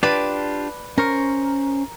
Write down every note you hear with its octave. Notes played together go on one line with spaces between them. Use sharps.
D4 F4 G4 B4 D5 A5
C#4 A#4 C5 C#6